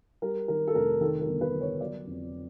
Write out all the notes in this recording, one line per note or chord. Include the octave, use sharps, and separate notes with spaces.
G3 A#4
D#3 A#4
A4
F1 A#4
D#3 A4
A#4
G1
B4
G1
C#5
F#3 D5
F2